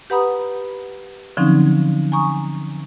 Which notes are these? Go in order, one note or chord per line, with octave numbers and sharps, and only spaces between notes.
G4 B4 F#5 A#5 B5 D#6
D3 F3 F#3 C4 C#4 D#4
G#5 A#5 C#6 D#6